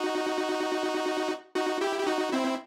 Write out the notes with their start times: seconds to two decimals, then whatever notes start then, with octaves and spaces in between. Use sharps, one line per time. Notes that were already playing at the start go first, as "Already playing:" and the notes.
Already playing: D#4 F#4
1.55 D#4 F#4
1.81 E4 G4
2.00 G4
2.07 D#4 F#4
2.32 C4 E4